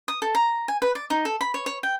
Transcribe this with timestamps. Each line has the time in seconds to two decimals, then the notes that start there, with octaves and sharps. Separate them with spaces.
0.08 D#6
0.22 A4
0.35 A#5
0.68 G#5
0.82 B4
0.95 D5
1.10 D#4
1.25 A4
1.41 B5
1.54 C#5
1.66 C#5
1.83 G5